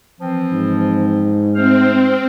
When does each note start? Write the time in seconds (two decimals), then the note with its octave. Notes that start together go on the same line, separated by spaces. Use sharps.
0.21 E3 F3 C4
0.52 G#2
1.56 A3 C4 C5 F6